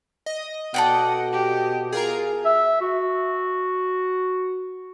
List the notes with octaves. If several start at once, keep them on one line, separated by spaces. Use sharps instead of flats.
D#5
B2 A4 D5 F#5 G5
G4
F4 G#4 A#4 A#5
E5
F#4